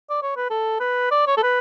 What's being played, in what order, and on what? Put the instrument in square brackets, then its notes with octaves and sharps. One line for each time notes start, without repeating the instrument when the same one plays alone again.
[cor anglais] D5
C#5
B4
A4
B4
D5
C#5
A4
B4